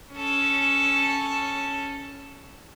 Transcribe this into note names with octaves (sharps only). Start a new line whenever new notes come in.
C#4 A4